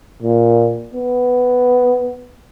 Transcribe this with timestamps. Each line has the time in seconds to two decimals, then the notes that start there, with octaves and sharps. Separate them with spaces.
0.22 A#2
0.94 B3